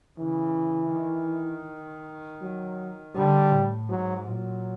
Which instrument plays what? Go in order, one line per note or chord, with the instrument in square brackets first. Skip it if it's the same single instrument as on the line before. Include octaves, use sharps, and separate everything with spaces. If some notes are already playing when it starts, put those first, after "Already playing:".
[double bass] C#3 [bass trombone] E3
[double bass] D#3
[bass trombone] F#3
[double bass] D3 [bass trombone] G3
[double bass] A2
[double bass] G#2 [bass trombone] F#3
[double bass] A#2 [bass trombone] F#3